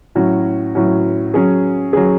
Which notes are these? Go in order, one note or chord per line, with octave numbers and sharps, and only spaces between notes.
A2 F#3 C#4 F#4
A2 F#3 C#4 F#4
F#3 C#4 G#4
F#3 C#4 G#4